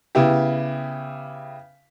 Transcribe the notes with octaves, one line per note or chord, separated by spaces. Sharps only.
C#3 B3 E4 G4